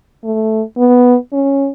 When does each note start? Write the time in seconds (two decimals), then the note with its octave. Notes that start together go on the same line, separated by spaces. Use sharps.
0.24 A3
0.78 B3
1.33 C#4